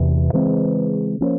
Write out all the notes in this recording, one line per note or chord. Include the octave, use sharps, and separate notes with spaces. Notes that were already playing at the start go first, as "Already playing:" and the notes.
Already playing: E2 C3 E3
C#3 E3 G#3 C4
F3 A#3 C#4